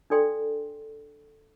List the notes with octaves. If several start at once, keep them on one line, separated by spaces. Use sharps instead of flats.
D4 A4 D5 G5 C6